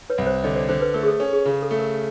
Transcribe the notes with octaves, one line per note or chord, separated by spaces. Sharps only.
B4 C#5
C2
C5
D3 C#5 D#5
C5 D5
D3 C5
B4
A3 A#4
G#4
A4
C#4 A4
G#4
C#3 G#4
A4
A3
A#4